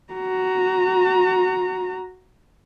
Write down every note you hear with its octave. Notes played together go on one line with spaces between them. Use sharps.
F#4 A#5